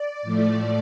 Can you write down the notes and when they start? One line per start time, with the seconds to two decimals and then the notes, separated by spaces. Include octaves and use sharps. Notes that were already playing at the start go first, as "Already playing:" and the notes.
Already playing: D5
0.23 A2 F3 A3